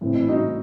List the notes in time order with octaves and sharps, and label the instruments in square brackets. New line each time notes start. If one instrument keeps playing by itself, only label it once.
[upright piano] A2 E3 C4
E4
D#4 F#4